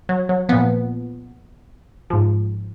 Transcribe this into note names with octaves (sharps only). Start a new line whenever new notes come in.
F#3
F#3
A#2 F3 B3
G#2 F3